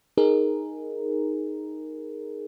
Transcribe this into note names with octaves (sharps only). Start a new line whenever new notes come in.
D#4 G#4 A#4